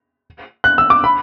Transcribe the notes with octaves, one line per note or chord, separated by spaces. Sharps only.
F#6
E6
D6
B5